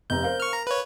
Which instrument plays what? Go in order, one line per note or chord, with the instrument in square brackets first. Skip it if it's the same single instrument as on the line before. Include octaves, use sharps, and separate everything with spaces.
[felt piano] F1 C3 A#5 [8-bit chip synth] G6
[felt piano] A#4 C5 F5
[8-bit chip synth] C#6 F6
A#5
B4 C#5